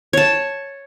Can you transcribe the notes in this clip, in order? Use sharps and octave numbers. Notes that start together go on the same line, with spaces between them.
C#5 A5